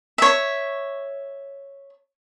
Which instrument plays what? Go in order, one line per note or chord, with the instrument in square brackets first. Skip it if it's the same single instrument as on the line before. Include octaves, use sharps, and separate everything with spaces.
[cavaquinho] C#5 E5